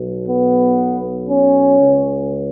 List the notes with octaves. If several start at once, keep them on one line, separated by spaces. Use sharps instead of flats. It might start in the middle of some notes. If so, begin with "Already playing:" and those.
Already playing: B1 B2
B3
C#4
C#2 C#3